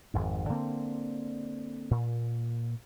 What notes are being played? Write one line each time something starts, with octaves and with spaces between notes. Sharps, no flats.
G#1 F2 G#2
D3 A#3 C4
A#2